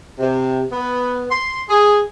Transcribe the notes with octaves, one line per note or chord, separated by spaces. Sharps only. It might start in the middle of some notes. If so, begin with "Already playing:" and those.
C3
B3
C6
G#4